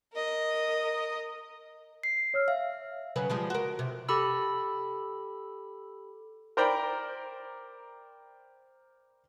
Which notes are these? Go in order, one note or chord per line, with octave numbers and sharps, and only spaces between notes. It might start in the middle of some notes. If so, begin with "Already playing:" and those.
A#4 D#5
C7
C#5 E6 F6
E5 F5
C#3 F#3 B4
F3 G3 G#3
F#4 A#4
C3
G4 A4 B5 E6
A#4 C5 D5 G5 A#5 B5